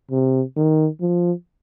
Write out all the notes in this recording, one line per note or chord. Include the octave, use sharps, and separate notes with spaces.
C3
D#3
F3